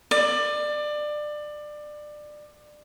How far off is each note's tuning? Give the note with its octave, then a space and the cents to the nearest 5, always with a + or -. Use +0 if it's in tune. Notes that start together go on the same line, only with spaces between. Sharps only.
D5 +25